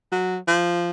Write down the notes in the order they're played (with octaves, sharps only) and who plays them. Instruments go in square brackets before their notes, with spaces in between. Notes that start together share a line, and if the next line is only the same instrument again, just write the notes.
[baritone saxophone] F#3
F3